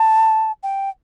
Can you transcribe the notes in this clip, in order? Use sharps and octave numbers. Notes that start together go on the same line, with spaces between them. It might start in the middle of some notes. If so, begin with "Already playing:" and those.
Already playing: A5
G5